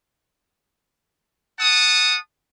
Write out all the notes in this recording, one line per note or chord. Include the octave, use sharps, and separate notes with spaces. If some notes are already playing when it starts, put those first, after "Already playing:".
F#5 A5 D#6